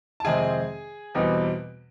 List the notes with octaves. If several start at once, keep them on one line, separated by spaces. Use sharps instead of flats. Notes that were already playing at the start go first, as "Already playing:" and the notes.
A5
F2 C3 D#3 G#3 C4 G#4 G#5
E2 B2 G3 C4 D#4